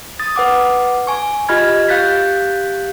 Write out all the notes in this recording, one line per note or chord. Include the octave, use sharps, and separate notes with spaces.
D#6 A6
B4 F#5 D6
G#5 C#6
F4 G4 D#5 B5 F6 G#6
G4 F5 F#6 G6 A6 B6